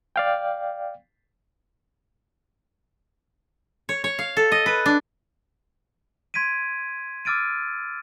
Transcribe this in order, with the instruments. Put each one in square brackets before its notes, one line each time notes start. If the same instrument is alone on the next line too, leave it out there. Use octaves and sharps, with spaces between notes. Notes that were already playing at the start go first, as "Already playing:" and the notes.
[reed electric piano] D5 F5 G5
[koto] C#5
C#5
F5
A4
D#5
B4
D4
[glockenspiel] C6 G#6 B6 D7 D#7
D6 E6 F6 A6 D7 D#7